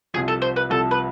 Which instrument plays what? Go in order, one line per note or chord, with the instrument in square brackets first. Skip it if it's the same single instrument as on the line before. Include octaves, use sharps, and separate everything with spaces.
[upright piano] C2 C3 F3 [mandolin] G#4
[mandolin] A4
C5
B4
[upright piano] C2 C3 F3 [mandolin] A4
[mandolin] B4